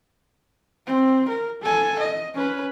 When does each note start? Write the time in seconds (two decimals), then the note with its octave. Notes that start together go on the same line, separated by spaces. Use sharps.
0.87 C4
1.29 A#4
1.62 A4 G#5
1.99 D#5
2.35 C#4 B4